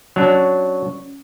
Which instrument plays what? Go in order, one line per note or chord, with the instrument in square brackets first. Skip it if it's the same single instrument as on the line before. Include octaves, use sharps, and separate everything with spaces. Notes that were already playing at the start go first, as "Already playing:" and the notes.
[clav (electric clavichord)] F#3 D4 [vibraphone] C#4